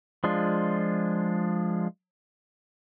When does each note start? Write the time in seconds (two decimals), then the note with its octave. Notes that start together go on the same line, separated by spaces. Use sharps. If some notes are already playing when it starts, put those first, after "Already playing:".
0.24 F3 G#3 D4 F4